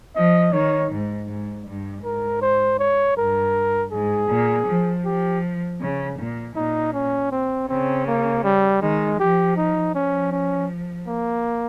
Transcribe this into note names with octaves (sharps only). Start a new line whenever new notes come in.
F3 D#5
D#3 C#5
G#2
G#2
G2
G#2 A#4
C5
C#5
G2 A#4
G#2 G#4
A#2
F3
F3 G4
C#3
A#2
A#2 D#4
C#4
C4
C#3 C4
A#3
G3
D#3 G#3
F3 G4
D#4
F3 C#4
C#4
A#3